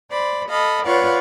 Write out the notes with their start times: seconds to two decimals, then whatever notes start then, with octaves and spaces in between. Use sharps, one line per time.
0.10 C5 D5 B5
0.49 A4 D#5 F5 B5
0.84 F4 B4 C#5 D5 F5 F#5